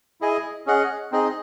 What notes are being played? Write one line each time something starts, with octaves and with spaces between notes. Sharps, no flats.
E4 G#4 D#5 G#5
C#4 G#4 D#5 F#5
C4 D#4 G#4 D#5